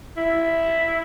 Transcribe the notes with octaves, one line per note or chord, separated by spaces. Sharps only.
E4